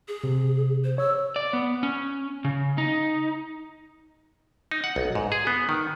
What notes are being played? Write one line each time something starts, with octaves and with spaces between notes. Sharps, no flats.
G#4
C3
C5
C#5 E6
D5
B3
C#4
C#3
D#4
D#4
F#5
B1
G#2
G#4
B3
D#3